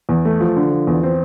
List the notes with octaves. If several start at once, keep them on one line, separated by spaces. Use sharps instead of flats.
E2
A3
F3
D3
F3
E2
C4